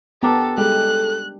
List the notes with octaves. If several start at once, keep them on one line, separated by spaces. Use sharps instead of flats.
B3 D4 G4 A4 A#4
G3 G#3 A4 F#6